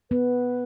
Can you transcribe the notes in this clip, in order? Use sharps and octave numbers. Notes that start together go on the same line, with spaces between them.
B3 B4